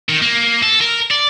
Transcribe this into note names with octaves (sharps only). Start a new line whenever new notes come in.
D#3
A#3
A4
A#4
D5